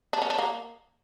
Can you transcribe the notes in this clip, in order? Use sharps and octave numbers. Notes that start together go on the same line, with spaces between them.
D4
C#4
D4
A#3